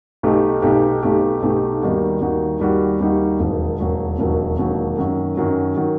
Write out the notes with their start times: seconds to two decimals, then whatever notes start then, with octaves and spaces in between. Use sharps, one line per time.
0.23 B1 B2 A3 D#4 G4
0.62 B1 B2 A3 D#4 G4
1.03 B1 B2 A3 D#4 G4
1.42 B1 B2 A3 D#4 G4
1.82 D#2 D#3 G3 D#4 F#4
2.21 D#2 D#3 G3 D#4 F#4
2.60 D#2 D#3 G3 D#4 F#4
3.00 D#2 D#3 G3 D#4 F#4
3.39 E1 D#2 D#3 F#3
3.80 E1 D#2 D#3 F#3
4.19 E1 D#2 D#3 F#3
4.58 E1 D#2 D#3 F#3
4.98 F#2 D#3 F#3
5.37 F#2 D#3 F#3
5.77 D#3 F#3